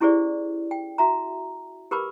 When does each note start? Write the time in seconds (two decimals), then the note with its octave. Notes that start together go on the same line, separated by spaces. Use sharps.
0.01 C#4 E4 G4 G#4 C5 D5
0.71 G5
0.98 F#4 E5 A#5
1.91 G4 A#4 B4 B5 D6